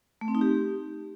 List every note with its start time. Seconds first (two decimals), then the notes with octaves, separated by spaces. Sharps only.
0.21 A3
0.28 C4
0.35 D#4
0.41 G4